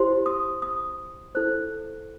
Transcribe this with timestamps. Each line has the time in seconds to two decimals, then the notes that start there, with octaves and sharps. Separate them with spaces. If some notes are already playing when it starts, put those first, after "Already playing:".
Already playing: E4 G4 C5 C6
0.26 D#6
0.62 D#6
1.35 E4 A4 C5 F#6